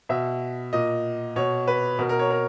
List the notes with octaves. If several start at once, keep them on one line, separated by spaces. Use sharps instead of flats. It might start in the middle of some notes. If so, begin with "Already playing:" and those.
B2 E5
A#2 D#5
B2 C#5
B4
B2 A#4
A#4
C#5
A#4